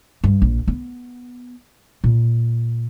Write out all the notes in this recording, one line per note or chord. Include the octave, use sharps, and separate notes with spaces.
G2
A#1
B3
A#2